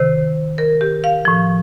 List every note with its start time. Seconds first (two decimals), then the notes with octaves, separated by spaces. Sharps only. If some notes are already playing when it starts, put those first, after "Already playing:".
Already playing: C3 D#3 C5
0.58 A#4
0.81 G4
1.04 F5
1.25 A2 F3